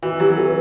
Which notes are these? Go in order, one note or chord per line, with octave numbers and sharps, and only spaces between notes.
E3 F#4
F#3 G4
E3 A4
B4